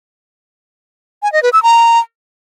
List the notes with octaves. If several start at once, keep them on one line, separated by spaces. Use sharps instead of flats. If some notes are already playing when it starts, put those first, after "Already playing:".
G#5
D#5
B4
E6
A#5